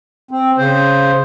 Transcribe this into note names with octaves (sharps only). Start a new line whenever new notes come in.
C4
C#3 C5